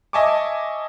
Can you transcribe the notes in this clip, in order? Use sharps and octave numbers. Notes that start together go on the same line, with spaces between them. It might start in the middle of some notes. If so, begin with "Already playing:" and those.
D#5 E5 G#5 A5 C#6 D6